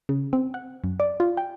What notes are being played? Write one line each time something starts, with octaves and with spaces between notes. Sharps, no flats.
C#3
C4
F#5
F#2
D5
F4
G5